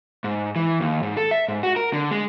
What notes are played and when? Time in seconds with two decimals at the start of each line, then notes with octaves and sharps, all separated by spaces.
0.24 G#2
0.56 E3
0.80 D#2
1.03 G#2
1.17 A4
1.31 E5
1.48 G#2
1.63 F#4
1.76 A#4
1.93 D3
2.11 G#3